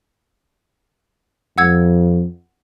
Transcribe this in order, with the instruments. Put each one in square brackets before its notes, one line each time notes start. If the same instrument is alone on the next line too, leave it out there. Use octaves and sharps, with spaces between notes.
[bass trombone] F2 [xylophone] F#5 E6 G#6